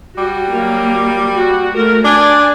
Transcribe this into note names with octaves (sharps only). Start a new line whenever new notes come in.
G3 F#4
F#3 A#3
F#4
A3 A#4
D4 D5 G#5